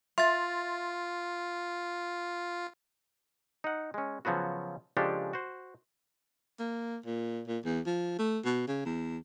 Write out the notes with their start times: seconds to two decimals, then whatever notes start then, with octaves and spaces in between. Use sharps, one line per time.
0.18 F4 E5 C6 A6
3.64 D#4 F#5
3.94 G#3 C#4
4.25 C#3 F3 F#3 B3 F#4
4.97 C#3 F3 G#3 D4 G4 A4
5.33 F#4 C5
6.60 A#3
7.06 A#2
7.48 A#2
7.65 E2
7.86 F3
8.19 A3
8.45 B2
8.68 C#3
8.86 E2